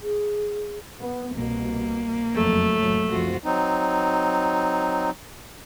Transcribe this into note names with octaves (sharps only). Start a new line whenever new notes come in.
G#4
B3
C2 B2 A#3
F#1 F2 F#3 A3
F1 A2 F#3
F#1 C2 F3 F4 F#4
F#3 C4 D#4